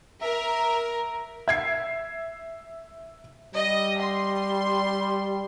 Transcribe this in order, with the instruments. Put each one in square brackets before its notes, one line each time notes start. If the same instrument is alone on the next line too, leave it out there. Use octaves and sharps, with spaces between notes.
[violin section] A#4 [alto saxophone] E5
[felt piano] E5 G#6 C7
[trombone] G3 [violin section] D#5
[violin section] C6